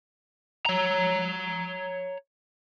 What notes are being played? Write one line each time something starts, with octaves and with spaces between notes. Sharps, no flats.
C#5 A#5